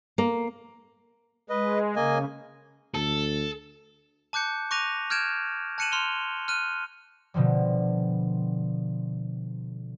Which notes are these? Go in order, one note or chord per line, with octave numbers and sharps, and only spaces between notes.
A#3
G#3 B4 D#5
C#3 A#3 D#5 G#5
D2 A4
A5 D6 F#6 G6 C#7
C#6 D6 F#6 A#6 D#7 F7
F6 G6 G#6 D7 E7
A5 F#6 C#7 D#7 E7 F#7
C6 F6 F7 G7
F6 F#6 D#7
B2 D3 F3 G3